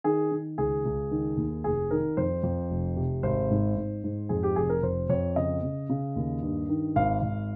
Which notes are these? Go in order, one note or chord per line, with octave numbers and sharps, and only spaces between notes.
D#3 G#4
D#3
C#2 G#4
C#2
D#3
D#2
F1 G#4
D#3 A#4
F2 C5
F2
F1
C3
G#1 C5
G#2
G#2
G#2
F2 G#4
G4
F1 G#4
A#4
F2 C5
F2 C#5
C#3 D#5
C#3
C#3
D#2
G2
D#3
G#1 F5
G#1